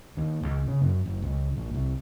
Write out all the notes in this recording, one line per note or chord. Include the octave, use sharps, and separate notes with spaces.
D#2
C#2
C#3
F#2
F#1
C#2
A#1
C2